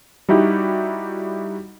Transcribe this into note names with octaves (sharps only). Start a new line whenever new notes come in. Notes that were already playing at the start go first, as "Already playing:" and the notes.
G3 D#4 E4 F#4 G4